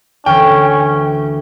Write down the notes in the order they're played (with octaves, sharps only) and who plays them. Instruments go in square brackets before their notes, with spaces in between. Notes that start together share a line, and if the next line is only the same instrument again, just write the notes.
[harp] D2 E3 [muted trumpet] C#4 [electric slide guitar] G5